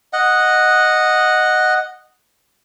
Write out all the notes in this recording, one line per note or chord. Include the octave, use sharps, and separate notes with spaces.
D#5 F#5